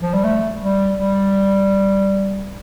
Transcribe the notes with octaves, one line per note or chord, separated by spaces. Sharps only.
F3
G3
A3
G3
G3